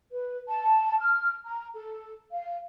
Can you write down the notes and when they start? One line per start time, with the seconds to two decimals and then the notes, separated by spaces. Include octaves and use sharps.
0.12 B4
0.48 A5
0.99 F6
1.45 A#5
1.74 A4
2.32 F5